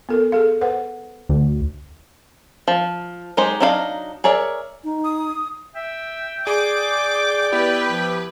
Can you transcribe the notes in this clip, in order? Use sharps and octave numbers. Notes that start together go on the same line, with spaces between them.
B3 A4 A#4
G#4 A4 F5
B4 C5 F#5
D2
F3
F#3 G#3 D#4 G4 C5
F#3 D4 D#4 A#4 F5
G#4 A#4 C#5 D5 E5
D#4
D#6
E5 G5
G#4 D5 D6
B3 E4 G4 B4
F3